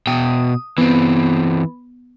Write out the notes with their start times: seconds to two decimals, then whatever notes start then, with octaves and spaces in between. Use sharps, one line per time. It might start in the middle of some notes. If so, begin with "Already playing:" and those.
0.07 B2 G5 D#6
0.78 E3 B3 C4